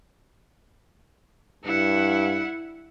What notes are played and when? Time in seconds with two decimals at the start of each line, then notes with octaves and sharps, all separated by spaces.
1.64 G2 E4 F#5